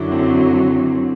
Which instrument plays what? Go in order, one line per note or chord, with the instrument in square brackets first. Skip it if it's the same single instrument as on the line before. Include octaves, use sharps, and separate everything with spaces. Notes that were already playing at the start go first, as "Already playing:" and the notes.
Already playing: [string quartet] F#2 D3 F#3 [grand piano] D4 E4
[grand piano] C4 D4